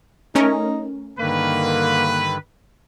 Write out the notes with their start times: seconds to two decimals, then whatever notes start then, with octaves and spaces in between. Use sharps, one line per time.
0.35 A3 C#4 D#4 A#4
1.19 G2 D3 D#3 A#3 B4